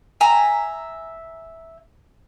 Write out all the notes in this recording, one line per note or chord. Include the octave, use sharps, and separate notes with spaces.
E5 G#5 A#5